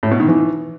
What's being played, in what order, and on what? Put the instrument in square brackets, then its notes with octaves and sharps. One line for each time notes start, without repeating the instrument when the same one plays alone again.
[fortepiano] A2
B2
D#3
E3